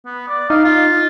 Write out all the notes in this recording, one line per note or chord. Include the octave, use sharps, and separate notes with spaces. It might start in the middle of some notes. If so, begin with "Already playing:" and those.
B3
D5
D#4 F5
F4